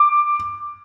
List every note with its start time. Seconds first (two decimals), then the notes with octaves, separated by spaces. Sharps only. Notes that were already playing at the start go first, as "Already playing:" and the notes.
Already playing: D6